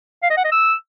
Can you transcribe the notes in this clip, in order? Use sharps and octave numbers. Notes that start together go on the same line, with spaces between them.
F5
D#5
F#5
D#5
E6